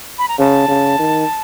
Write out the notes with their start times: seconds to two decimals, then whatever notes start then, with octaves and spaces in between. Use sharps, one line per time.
0.19 B5
0.28 A#5
0.39 C#3 A5
0.68 C#3
0.99 D#3